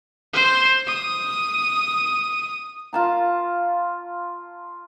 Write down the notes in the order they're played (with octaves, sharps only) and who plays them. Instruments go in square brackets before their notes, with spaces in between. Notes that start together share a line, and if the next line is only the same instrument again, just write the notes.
[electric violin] C5
D#6
[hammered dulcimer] F4 A5 A#5